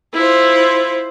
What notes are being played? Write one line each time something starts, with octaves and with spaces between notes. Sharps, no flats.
E4 F4 C5